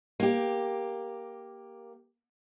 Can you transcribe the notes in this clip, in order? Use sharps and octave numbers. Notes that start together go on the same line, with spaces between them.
A#3 G4